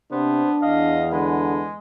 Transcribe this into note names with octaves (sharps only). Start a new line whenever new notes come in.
C3 B3 D4 C5
E2 D#5 F5
D3 G#3 B4